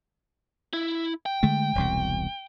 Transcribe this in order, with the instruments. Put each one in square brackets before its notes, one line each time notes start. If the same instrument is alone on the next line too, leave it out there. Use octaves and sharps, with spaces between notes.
[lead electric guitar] E4
G5
[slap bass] D3 G#3 A3
E1 C2 B2